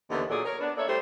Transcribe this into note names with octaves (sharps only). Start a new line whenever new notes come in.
D#2 D3 E3 B3 D#4
A#2 F#3 G#4 A4 D5
A#4 C#5
B3 D4
A#3 A4 C#5 D5 E5
G3 A3 E4 G4 C5